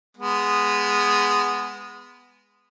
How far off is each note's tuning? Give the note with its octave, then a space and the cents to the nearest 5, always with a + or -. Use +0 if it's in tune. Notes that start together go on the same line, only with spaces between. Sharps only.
G#3 -10 B3 +0